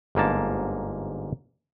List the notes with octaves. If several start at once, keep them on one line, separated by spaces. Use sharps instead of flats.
G1 G#2 A#3 A5